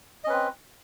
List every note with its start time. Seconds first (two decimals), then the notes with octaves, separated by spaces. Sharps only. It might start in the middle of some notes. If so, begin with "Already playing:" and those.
0.24 D#5
0.27 C#4
0.30 B4
0.33 C4